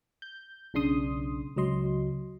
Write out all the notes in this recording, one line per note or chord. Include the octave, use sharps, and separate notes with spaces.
G6
B1 C#3 D4 C6 D#6
C#2 F#3 D#5 C6